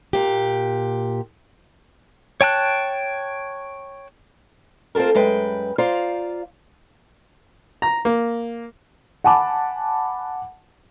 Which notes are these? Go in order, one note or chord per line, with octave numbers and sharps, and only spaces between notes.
A#2 G4
C#5 G5 A5 F#6
C4 F4 G4 A4 A#4
F#2 G#3 B4 G5
F4 C5 D5 F5 A#5
A#5
A#3
F#5 G#5 A5 B5 D6